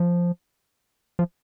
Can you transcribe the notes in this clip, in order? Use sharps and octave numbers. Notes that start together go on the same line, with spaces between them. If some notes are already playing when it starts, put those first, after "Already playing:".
Already playing: F3
F3